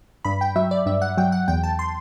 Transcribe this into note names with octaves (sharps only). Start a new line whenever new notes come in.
G2 B5
G5
F#3 E5
D5
G2 E5
F#5
F#3 G5
F#5
E2 G5
A5
C6